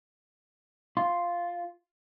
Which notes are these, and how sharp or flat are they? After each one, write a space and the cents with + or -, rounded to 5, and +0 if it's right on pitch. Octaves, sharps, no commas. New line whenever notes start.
F4 +0 C6 +0